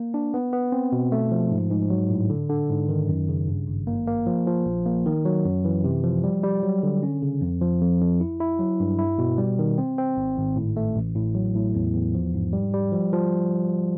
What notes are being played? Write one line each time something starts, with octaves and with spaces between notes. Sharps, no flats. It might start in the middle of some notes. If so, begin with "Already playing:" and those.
Already playing: A#3
D4
B3
B3
C4
B2
A3
F3
G#2
G#2
F#3
A2
D3
D3
G#2
D#3
F#2
C#3
G2
G#1
A#3
A#3
F3
F3
A#1
A#3
D#3
F#3
F#2
E3
C3
F3
G3
G3
F#3
D3
C#4
C#3
F2
F3
F2
F2
E4
E4
F#3
G2
E4
B2
G3
D#3
C4
C4
G#1
G#1
A2
A3
A1
A2
F#3
A2
E2
E2
F3
G#2
G3
G3
F3
F3